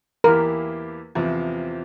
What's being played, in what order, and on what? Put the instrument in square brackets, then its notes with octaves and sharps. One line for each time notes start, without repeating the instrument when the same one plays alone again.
[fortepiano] E2 E3 A#3 E4 G4 [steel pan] A#4
[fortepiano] E2 C3 F3 C4